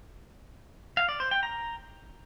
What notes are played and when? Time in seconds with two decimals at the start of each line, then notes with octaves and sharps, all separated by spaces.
0.97 F5
1.09 D5
1.20 C5
1.31 G5
1.43 A#5